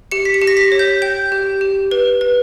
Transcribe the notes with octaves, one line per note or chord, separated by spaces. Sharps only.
G4 C#7
B6
C#7
G4
A#6
B6
C#5
G6
G5 G6
G4
G4
B4
B4